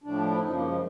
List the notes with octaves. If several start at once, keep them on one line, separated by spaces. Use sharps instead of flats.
A2 F3 D4
E4
F#2 C#3 F3 D#4
A#3
G#3